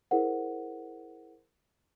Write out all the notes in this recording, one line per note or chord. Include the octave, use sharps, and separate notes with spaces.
E4 G#4 A#4 C5 F#5